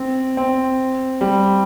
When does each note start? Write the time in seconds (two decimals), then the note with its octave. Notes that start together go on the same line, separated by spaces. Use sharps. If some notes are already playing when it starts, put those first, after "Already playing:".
Already playing: C4
0.37 C4
1.21 G3